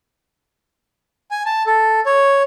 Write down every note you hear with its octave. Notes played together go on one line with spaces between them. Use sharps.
G#5
A5
A4
C#5